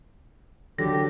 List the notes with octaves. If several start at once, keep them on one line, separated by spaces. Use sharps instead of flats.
D3 E3 F#3 G4 A#6